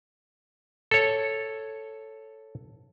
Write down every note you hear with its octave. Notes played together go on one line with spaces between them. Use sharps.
A4 C#5